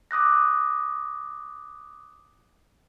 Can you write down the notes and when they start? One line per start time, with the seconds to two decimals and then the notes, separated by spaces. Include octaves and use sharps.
0.11 D6 D#6 F#6 A#6